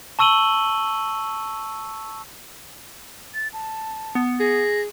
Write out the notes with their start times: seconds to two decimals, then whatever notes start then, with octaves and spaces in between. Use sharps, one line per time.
0.19 A5 C#6 E6 D#7 F#7 G7
3.34 A6
3.53 A5
4.15 B3
4.40 G#4 A#6